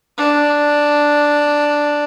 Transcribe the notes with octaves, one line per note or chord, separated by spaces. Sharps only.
D4